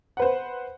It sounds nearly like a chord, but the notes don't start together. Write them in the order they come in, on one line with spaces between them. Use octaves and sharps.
F#5 B4 C5